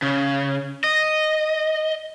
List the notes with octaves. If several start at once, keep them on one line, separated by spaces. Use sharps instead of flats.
C#3
D#5